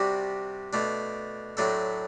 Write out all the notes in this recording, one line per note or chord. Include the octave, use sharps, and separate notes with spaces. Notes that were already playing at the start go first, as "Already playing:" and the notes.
Already playing: C3 G3 D4 F#4
B2 A3 D4
A2 F#3 A3 D4 A4